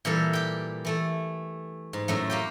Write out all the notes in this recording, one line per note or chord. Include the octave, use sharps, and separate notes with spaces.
A#2 E3 G3 A4
G4 G5
E3 A3 A4
G#2
F#2 A2 A3
A#3 G4 G5